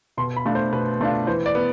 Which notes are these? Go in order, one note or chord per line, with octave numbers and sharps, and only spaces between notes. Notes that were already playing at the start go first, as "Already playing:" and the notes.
B2 C6
B5
A3 D4 F4
C5
B2 B4
A3 D4 F4
E3 C5
D5
B3